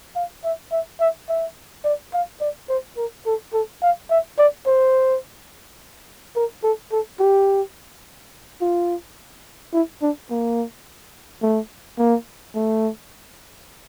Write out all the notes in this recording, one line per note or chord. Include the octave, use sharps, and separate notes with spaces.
F5
E5
E5
E5
E5
D5
F5
D5
C5
A#4
A4
A4
F5
E5
D5
C5
A#4
A4
A4
G4
F4
E4
D4
A#3
A3
A#3
A3